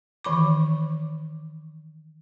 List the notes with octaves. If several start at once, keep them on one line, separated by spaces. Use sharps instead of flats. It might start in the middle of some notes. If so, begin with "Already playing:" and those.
D#3 E3 B5 D6